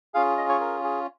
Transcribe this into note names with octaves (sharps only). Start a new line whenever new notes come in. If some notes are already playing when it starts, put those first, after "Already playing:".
C#4 F4 G#4 F5
D#5
C#5
A#4
G#4